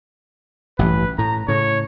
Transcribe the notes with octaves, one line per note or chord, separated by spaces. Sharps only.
A1 G2 E3 B4
A2 A#5
A2 C#3 C#5